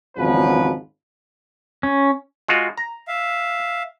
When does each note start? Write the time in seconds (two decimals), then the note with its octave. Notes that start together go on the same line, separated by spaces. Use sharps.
0.17 G#1 E2 C#3 F3 F#3 B4
1.83 C#4
2.48 G#3 F4 F#4
2.78 A#5
3.08 E5 F5